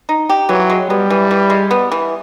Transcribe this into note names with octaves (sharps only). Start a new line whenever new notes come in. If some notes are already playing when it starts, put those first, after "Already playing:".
D#4
G4
E3 F#3
G#3
G3 B3
E3
E3
G#3
B3
E3